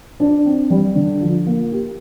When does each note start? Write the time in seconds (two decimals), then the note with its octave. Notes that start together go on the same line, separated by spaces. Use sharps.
0.20 D4
0.45 C4
0.70 G3
0.96 D3
1.21 F3
1.46 A#3
1.72 G4